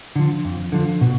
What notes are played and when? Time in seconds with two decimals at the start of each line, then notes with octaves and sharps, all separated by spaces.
0.16 D3 F3
0.45 F2
0.72 D3 F3
1.01 B2